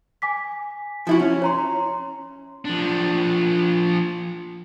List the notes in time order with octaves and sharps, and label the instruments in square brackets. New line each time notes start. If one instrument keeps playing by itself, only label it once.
[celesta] G#5 D6 B6
[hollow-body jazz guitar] F3 E4 F#4
C#4
[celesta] C#5 A#5 C6
[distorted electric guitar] F3 D4